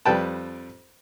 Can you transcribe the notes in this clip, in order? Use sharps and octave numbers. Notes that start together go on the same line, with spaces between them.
F2 G3 B4 G5 A5